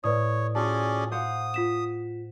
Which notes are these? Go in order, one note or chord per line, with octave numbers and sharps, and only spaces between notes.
A2 B4 C#5 D5 D#6
C#4 F4 F#4 G#4 D5 A5
C5 F5 F#5 D#6
F4 B6 E7